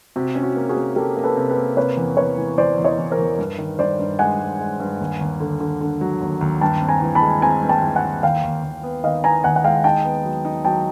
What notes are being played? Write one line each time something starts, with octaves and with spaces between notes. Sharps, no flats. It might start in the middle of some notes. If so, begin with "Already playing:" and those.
C3 F#4
C#4
F#4
A#3
F#4 G#4
A#3
A#3 G4 A4
A#3
A4 B4
C3
A4 B4
A#3
C3 B4 C#5
E2
E2 B4 C#5
E3
E3 C5 D5
E2
C#5 D#5
E2
A#4 C5
E2
G2
D#3
G2 C5 D5
G2
G#3 F#5 G#5
G#3
G#3
G2
D#2
D#2
D3
D3
D3
F#3
D#2
D#2
G2 G5 A5
C4
G#5 A#5
E3
A5 B5
G#3
C4 G#5 A#5
G2
G5 A5
E3
F#5 G#5
E3
D#2 F5 G5
D#2
D#2
B3
D#3 D#5 F5
B3 G#5 A#5
D#2 F#5 G#5
F#5
G#3 F5 G5
D#4 G5 A5
B3
F#3
D#4
F#3 G5 A5